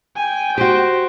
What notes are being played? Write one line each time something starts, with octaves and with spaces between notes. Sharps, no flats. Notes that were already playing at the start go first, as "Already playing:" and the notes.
G5 G#5
F#4 G4 C5